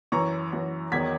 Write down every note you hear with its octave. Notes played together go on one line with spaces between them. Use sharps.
F#2 E3 A#5 C#6
F#2 E3
E2 D#3 F#3 G#6 B6